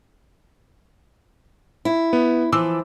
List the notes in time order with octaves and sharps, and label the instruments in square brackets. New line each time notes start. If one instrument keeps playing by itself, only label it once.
[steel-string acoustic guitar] E4
[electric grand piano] B3
[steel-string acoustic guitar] E3 F3 [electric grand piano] D6 E6